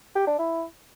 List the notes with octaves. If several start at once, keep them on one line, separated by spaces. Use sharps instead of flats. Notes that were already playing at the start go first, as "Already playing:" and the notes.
G4
D4
E4